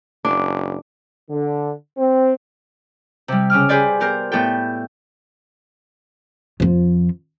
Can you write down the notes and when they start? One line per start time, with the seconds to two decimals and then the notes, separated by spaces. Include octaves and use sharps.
0.25 F#1 D4
1.30 D3
1.97 C4
3.28 C3 G3
3.50 C#3 C#4 D6 F6
3.69 G4 G#4 B4 C5 D5 G#5
4.00 B3 G4 A#4 C5
4.32 A2 B3 G4 A4 G5
6.60 F2 F3